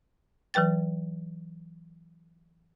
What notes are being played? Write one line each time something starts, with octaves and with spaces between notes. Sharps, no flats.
E3 F#3 B4 G5 A6